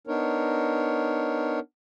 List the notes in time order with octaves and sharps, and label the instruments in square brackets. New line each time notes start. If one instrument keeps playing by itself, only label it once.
[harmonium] B3 D4 D#4 A#4 C#5